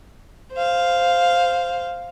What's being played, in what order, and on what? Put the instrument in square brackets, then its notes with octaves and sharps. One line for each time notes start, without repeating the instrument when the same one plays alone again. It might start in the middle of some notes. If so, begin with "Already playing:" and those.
[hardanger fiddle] C5 F5